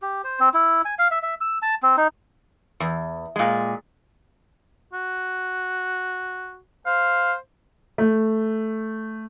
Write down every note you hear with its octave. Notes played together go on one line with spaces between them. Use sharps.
G4
C5
C4
E4
G#5
F5
E5
E5
E6
A5
C4
D#4
E2
A#2 G#3
F#4
C5 F5
A3